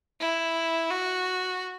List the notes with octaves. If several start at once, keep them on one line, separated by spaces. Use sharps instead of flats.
E4
F#4